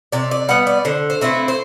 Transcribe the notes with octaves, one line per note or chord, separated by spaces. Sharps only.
C3 D5
D5
G3 B3 F#5
D5
D3 C5
C5
A3 C4 E4 B4
C5